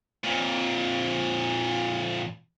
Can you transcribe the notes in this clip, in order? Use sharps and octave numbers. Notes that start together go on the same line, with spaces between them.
F2 A#2